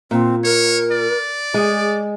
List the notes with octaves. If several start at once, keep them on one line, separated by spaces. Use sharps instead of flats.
A#2 C4
A#4 C#5
D5
G#3 G#4